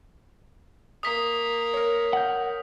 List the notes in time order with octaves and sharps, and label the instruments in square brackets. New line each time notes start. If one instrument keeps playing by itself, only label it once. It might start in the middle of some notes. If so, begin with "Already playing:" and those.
[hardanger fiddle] A#3 [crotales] D#6 B6
[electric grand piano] A#4 C#5
[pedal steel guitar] F#5 G6